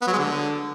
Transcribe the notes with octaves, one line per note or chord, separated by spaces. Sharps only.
B3
F#3
G#3
D3